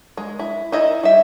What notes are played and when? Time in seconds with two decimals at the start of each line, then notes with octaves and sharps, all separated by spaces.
0.17 G#3
0.39 E4
0.72 D#4 E4 D#5
1.03 G3 E5